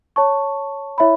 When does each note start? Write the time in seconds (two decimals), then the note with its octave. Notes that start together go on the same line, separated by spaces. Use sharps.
0.16 C#5 A5 C#6
0.98 E4 C#5 E5 B5